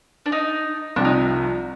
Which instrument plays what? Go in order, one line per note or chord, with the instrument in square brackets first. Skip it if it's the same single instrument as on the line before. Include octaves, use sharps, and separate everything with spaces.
[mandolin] D4
D#4
[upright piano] C2 C3 F3 [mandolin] D4
[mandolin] D#4